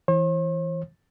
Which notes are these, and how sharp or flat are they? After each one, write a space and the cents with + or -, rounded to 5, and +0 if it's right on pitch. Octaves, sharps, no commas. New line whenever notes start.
E3 +0 C5 +45